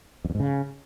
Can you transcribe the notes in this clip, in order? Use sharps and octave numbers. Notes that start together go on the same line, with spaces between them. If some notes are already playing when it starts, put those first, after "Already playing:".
F2
E2
G#2
C#3